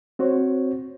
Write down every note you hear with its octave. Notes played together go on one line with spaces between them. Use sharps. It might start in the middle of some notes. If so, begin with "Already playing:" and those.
C4 F#4 C5 C#5